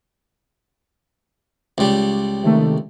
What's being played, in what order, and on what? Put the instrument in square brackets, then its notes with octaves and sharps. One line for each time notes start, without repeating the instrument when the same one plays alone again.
[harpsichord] C#2 G3
[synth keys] C3 D#3 A3